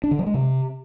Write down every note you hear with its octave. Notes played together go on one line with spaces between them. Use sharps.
D4
D3
F#3
G#3
C3